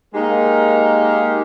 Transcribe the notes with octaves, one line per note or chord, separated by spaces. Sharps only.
G#3 A#3 D#4 G4 A#4